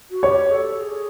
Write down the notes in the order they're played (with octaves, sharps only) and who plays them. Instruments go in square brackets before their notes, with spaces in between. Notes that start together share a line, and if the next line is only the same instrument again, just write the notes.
[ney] F#4
[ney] G4 [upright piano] C#5
[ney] A4
G#4